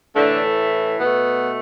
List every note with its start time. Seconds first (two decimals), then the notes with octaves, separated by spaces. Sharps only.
0.15 A2 D3 E3 A3 D4
0.99 B2 A3 B3